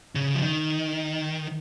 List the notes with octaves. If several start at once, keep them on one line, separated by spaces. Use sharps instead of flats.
C#3
F3
D#3